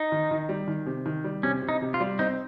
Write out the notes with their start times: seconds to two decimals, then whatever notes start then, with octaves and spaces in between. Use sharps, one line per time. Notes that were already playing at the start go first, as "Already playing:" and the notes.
Already playing: D#4
0.12 D#3
0.31 D#3
0.49 G3
0.68 D#3
0.86 C3
1.06 D#3
1.24 G3
1.43 C3 C#4
1.62 C3
1.69 D#4
1.82 C3
1.94 F4
2.00 G3
2.19 C4 D#4